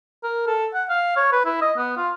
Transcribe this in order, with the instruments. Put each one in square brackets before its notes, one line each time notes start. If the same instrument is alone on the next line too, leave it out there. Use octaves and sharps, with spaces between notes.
[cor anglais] A#4
A4
F#5
F5
C#5
B4
E4
D#5
B3
F4